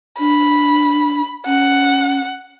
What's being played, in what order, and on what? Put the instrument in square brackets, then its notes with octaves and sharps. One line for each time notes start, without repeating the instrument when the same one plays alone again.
[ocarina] D4 [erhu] B5
[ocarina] C#4 [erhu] F#5